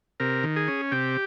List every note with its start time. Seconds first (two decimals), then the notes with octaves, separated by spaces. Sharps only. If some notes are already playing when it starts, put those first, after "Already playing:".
0.20 C3 A#4
0.43 D#3
0.56 G#4
0.68 C#4
0.92 C3 G4